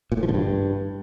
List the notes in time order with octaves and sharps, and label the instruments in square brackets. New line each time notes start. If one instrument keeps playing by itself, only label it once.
[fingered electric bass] A#2
A2
F3
D3
G2